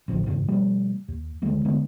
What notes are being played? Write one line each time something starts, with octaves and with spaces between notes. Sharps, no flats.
A1 D2 F3
E2 G#2 C#3
B2 F3 G3 A3
D#2
D2 D#3 G#3 A3
D3 G#3 B3